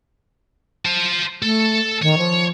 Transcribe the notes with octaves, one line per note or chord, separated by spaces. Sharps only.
C5 A5
A3 A4
D#3 C#5
F3